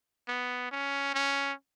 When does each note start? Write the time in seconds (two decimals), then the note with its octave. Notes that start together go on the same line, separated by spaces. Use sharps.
0.28 B3
0.71 C#4
1.14 C#4